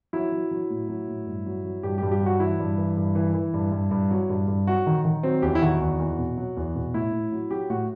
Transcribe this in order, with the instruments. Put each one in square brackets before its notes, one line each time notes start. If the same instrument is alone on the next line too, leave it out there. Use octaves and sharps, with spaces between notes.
[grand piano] F#3 E4
F#3
F#3
A2
F#3
A2
G2
F#3
F#3
G2 G4
G4
G2
G4
F#3
F#4
E3 E4
G2
E3
G2
E3
E3
G2
G2
G2
F#3
G2
G2
F#3 F#4
D#3
D#3
F#3 C4
E2 G4
E4
D#3 F#4
E2
E2
B2
F#3
E2
B2
A2 E4
A2
F#3
F#3 G4
A2 F#4